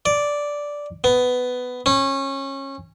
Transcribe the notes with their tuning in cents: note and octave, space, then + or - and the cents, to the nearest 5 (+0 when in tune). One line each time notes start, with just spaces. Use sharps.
D5 -5
B3 +15
C#4 -25